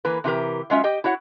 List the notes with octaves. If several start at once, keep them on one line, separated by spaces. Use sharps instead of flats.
E3 A#3 B4
C3 E3 G4 A#4
F#3 G#3 C#4 F4 E5
G4 D#5 G5
E4 F#4 C#5 F#5